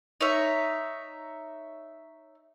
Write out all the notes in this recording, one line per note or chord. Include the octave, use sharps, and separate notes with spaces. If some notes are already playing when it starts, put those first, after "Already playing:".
D#4 C#5 E5